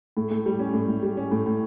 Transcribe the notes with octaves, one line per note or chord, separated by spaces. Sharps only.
A2
A2
G3
C#4
A2
A2
G3
C#4
A2
A2